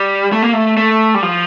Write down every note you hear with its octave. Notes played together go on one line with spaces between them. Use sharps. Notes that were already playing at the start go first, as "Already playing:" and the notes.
Already playing: G3
A3
A#3
A3
A3
G3
F3